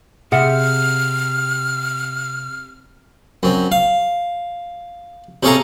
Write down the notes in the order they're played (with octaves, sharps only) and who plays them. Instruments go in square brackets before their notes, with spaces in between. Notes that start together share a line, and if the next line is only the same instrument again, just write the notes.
[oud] C3 [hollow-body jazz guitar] G#4 E5 F#5 [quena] F6
[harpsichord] F#2 C4
F5
C3 C#4 G#4 A4 F5 A#5